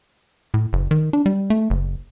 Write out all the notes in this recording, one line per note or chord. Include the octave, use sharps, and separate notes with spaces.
A2
F#1
D#3
D4
G3
A3
F#1